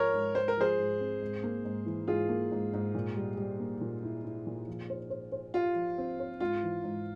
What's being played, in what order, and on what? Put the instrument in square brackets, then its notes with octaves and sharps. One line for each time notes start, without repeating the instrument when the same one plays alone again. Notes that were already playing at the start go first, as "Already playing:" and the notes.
Already playing: [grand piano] G#2 F3 G#3 [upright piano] A#4 C#5
[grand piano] G#2
[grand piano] G#3 [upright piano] C5
[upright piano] A#4
[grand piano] F3 [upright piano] G#4 C5
[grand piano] G#2
C4
G#2
A#3
G#2
E3
[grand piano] G#2 [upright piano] F4 G#4
[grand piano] A#3
G#2
G#2
A#2
G3
G3
A#3
A#2
E4
E4
A#2
F3
C5
C5
C5
[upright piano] F4 [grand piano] G4
[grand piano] F3
C4
C5
[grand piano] G#2 [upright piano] F4
[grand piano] E3
G#2